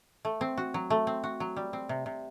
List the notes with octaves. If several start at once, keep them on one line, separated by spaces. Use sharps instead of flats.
A3
C4
F#4
F#3
A3
C4
F#4
F#3
G3
C4
C3
C3